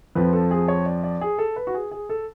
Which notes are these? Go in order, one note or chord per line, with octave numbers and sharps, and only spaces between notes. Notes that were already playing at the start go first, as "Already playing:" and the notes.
F2 F3 B4
A4
G#4
C#5
D5
D5
G#4
A4
B4
F#4
G#4
G#4
A4